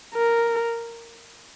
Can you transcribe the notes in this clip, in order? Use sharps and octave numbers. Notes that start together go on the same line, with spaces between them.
A#4